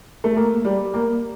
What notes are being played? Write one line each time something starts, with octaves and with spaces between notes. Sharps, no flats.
A3
A#3
G3
A#3